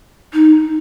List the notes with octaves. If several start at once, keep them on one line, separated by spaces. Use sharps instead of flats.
D#4